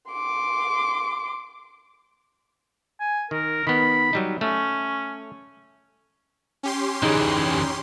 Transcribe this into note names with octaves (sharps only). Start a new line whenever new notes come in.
C6 D6
G#5
D#3 A#4
D#3 B3 B5
F#3 G3 D#4
A3 C#4
C#4 G4 C6
D3 E3 D#4 G#4